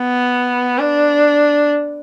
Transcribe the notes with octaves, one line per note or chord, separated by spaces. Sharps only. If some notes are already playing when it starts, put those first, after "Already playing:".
Already playing: B3
D4